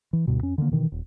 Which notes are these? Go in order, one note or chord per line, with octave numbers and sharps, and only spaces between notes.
E3
D2 G2 B2
F2 C#4
D3 D#3 G3 A#3
B2 D#3 E3
D#1